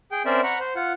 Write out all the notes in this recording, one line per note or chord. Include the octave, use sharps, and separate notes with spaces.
G#4 G5
C4 C#4 A#4 C5 D5 E5
F#5 A#5 B5 C#6
C5
F4 F#5